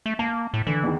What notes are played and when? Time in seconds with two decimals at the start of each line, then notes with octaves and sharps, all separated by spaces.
0.06 A3
0.19 A#3 A5
0.54 A2
0.67 D3 E3
0.84 E2 D#3